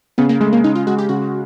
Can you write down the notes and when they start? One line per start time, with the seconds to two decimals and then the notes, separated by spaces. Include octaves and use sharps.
0.18 C#3 B3
0.29 A#3
0.40 G#3 A3
0.53 A#3
0.64 C#3 D#4
0.75 F4
0.87 G#3 F#4
0.98 G4
1.09 C#3 F#4